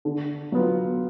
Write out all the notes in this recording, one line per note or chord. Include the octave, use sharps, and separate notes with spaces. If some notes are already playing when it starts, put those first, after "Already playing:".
D3
F#3 B3 F4